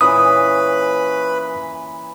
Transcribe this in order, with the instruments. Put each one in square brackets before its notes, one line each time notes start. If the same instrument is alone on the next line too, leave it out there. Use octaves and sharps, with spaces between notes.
[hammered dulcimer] A#2 E3 C#4 [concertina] B4 B5 [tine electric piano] D#6